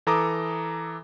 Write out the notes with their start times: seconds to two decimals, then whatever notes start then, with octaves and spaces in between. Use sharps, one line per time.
0.07 E3 A4 A#5 D6 D#6